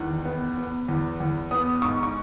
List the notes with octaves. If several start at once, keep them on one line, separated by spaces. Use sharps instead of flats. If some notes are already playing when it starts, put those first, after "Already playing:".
Already playing: E2 D#3 F#6
B3
B3
E2
E2
B3 D#6
G#2 C#6
C#6